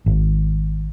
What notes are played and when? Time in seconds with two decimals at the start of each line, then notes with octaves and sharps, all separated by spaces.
0.06 G#1